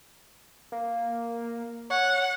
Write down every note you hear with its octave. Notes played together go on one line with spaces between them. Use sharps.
A#3
C#5 F#5